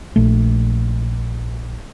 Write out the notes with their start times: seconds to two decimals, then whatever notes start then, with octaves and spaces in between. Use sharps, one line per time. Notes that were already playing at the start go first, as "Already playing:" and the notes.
0.16 A#1 A3